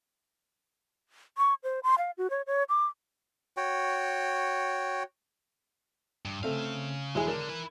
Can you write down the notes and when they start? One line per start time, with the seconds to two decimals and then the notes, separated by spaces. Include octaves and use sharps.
1.38 C#6
1.63 C5
1.83 C6
1.98 F5
2.18 F#4
2.30 C#5
2.47 C#5
2.69 D6
3.57 F#4 C#5 G5
6.25 G2
6.43 C#3 A3 C4 F5
7.15 E1 G#3 E4 G#4
7.28 D3 D4 A#4
7.49 E4 B4